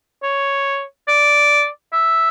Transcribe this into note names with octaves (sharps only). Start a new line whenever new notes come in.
C#5
D5
E5